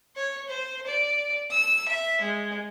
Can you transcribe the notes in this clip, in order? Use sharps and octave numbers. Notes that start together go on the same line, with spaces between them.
C#5
C5
D5
E6
E5
G#3